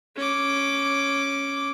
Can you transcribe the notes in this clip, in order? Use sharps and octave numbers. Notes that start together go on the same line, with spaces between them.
C#4 D6